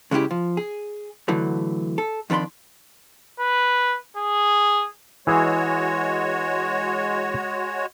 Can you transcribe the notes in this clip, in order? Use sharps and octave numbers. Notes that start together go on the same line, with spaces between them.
C#3 G#3 C#4 E4 G4
F3
G#4
D3 E3 F#3 A3
A4
F2 D#3 D4 B5 C6
B4
G#4
E3 G#3 F#4 G#4 C#5